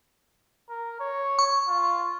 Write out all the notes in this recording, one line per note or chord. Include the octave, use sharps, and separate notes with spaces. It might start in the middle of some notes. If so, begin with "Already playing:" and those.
A#4
C#5
C#6
F4